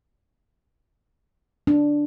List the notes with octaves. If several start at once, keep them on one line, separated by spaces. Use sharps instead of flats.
D4